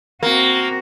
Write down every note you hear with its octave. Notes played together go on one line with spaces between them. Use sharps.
A#3 C4 F#4